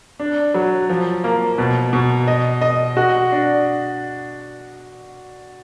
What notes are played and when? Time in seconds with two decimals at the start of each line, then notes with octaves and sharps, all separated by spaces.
0.20 D4
0.54 F#3
0.89 F3
1.24 A#3
1.58 B2
1.93 B2
2.28 D#5
2.61 D#5
2.97 F#4
3.32 D4